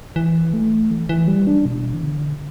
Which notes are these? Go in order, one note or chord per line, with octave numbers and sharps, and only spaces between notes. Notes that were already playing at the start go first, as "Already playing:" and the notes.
E3
A3
E3
E3
G3
D4
B2
E3
D3